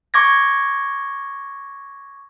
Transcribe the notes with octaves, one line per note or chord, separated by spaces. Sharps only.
C#6 D6 G#6 A#6